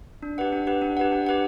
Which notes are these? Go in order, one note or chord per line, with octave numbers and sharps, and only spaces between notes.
D4
G4 B4 F#5
D4
G4 B4 F#5
D4
G4 B4 F#5
D4
G4 B4 F#5